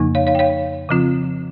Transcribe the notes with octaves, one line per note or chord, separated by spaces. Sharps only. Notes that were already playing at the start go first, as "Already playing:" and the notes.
Already playing: F2 C#3 F3 A#3 D#4
C#5 F5
C#5 F5
G5
C#5 F5
C#3 F3 C4 F4